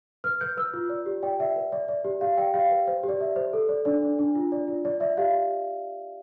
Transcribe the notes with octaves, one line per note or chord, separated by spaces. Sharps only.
B4 F6
B4 G6
B4 E6
F4
D5
G4
D5 G5
D5 E5
B4
D5
D5
G4
G4 F5
D5 G5
G4 F5
B4
C5
G4
D5
G4 E5
C5
A4
D5
D4 D5
D4
D4
F4
D5
F4
D5
D5 E5
G4 F5